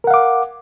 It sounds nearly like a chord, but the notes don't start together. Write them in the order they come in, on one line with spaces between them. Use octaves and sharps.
A#4 F#5 F5 D6